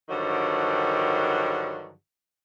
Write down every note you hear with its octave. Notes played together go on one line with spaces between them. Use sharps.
G2 D3 D#3 F3 F#3